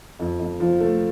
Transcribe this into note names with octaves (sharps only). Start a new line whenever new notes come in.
F2
F2
F3
A3